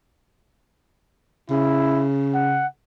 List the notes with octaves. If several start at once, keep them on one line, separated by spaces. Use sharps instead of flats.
C#3 E4
F#5